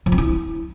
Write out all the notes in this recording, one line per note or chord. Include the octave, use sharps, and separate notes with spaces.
F3
C4
E4